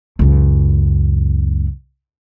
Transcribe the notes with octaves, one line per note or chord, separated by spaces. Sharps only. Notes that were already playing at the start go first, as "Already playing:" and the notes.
C#2 F#2